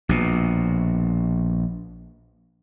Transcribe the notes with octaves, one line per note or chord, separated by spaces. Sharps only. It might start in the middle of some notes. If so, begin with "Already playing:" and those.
A#1 B2